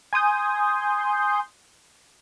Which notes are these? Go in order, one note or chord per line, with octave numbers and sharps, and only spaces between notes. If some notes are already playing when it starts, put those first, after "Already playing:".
G#5 C6 D#6 G6